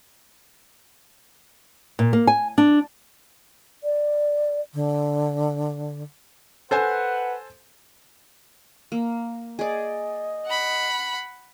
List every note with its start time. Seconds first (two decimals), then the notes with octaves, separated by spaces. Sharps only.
1.99 A#2
2.13 A#3
2.27 G#5
2.58 D4
3.84 D5
4.74 D3
6.71 A4 B4 C5 F#5 G#5
8.92 A#3
9.59 G#4 D5 D#5
10.46 F#5 B5